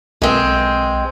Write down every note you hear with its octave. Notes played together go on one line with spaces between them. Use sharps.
B1 G#3 C4